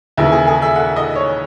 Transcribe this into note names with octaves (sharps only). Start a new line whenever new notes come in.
D#2 C#3 E3 E4
G#4
G#4
E5
F#5
D#5
C#5